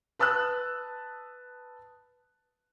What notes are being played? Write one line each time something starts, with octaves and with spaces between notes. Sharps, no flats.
B4 A5 D#6 E6 F#6